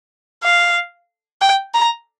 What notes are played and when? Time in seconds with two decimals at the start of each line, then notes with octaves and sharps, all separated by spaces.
0.43 F5
1.41 G5
1.74 A#5